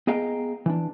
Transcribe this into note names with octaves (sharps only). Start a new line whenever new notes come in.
B3 G#4 D#5 F5 G5 A#5
E3 D4